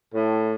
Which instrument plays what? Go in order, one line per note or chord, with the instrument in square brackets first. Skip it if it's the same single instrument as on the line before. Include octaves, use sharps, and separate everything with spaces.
[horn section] A2